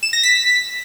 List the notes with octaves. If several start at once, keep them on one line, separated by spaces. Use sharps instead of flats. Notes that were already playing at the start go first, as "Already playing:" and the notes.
E7
A#6
B6